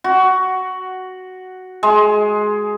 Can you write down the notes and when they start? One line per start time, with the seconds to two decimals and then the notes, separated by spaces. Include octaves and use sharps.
0.04 F#4
1.83 G#3